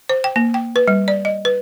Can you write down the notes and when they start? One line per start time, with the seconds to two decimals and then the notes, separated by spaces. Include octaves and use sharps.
0.09 C5
0.24 G5
0.36 A#3
0.54 G5
0.76 B4
0.88 G3
1.08 D5
1.25 D#5
1.45 B4